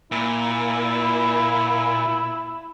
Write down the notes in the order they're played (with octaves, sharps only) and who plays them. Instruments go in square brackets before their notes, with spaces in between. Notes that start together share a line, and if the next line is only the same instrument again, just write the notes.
[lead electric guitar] A#2 [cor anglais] E4